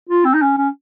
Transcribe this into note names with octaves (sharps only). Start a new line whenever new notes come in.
F4
C4
D#4
C#4
C#4